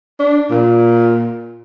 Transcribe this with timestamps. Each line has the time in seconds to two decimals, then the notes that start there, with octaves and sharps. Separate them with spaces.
0.20 D4
0.51 A#2